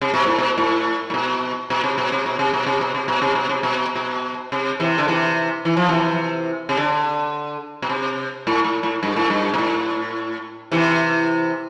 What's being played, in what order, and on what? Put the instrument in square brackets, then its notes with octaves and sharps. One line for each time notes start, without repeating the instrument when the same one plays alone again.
[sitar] C3
B2
A2
B2
A2
A2
B2
B2
C3
B2
C3
B2
C3
B2
C3
B2
C3
B2
C3
B2
C3
B2
B2
C3
C3 E3
D3
C3 E3
E3
F3
C3 E3
C3
D3
B2
C3
A2
A2
A2
G2
A2
G2
B2
A2
C3 E3